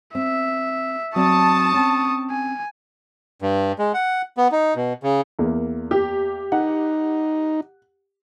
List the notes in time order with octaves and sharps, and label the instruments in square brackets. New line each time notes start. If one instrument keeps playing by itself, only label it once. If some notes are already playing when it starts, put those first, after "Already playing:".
[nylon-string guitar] C4 [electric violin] E5
[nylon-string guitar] F#3 C4 D5 [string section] A5 [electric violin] C#6 D#6
[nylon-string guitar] C4 C#4
[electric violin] G#5
[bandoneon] G2
G#3
F#5
B3
D#4
B2
C#3
[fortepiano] E2 A#3
[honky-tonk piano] G4
[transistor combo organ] D#4 [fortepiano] F#5